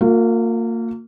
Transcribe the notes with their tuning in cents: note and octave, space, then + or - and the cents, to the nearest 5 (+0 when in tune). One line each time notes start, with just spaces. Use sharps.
A#3 -30 F4 +40